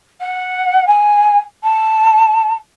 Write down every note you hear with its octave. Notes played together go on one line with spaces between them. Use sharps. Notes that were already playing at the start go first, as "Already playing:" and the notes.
F#5
G#5
A5